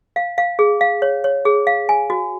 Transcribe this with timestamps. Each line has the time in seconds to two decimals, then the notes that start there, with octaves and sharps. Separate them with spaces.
0.16 F5
0.38 F5
0.59 G#4
0.81 F5
1.02 C#5
1.24 C#5
1.45 G#4
1.67 F5
1.89 G#5
2.10 F#4